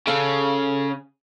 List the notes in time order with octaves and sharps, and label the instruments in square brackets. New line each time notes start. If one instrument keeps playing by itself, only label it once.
[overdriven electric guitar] C#3 [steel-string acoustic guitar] A4 C#5 F5